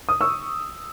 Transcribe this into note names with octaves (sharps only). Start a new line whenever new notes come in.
D#6
C#6 E6